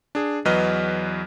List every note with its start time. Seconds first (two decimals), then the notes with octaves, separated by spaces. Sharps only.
0.15 D4 G#4
0.45 E2 F#3 B4 D#5 F6